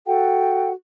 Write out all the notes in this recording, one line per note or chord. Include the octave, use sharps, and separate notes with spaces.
F#4 A4 F#5 G5